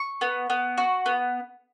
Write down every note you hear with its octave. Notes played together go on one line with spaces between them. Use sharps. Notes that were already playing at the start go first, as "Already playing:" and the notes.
Already playing: C#6
B3
B3
F#4
B3